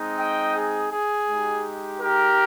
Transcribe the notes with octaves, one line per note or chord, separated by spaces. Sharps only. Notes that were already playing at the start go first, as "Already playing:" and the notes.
Already playing: G#3 C4 D#4
D#5 G5
G#4
G#4
G#3 D#4 G4
G4 A#4